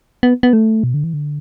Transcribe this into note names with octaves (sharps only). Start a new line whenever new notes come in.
B3
B3
A3
B2
D3
E3
D3